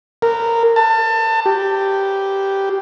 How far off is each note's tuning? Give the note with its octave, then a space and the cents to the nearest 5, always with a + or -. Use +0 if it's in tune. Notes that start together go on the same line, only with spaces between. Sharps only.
A#4 -15
A5 +25
G4 -5